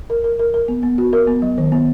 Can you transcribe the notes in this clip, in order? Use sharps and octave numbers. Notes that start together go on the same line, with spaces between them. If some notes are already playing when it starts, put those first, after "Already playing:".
A#4
A#4
A#4
A#4
B3
B3
F#4
A#4
B3
F#3
D#3
B3